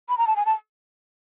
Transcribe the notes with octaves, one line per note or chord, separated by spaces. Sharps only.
B5
A#5
A5
G#5
A5